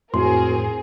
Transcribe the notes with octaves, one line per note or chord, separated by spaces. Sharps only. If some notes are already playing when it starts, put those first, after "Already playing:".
F2 A2 C4 F#4 G#4 A#4 C6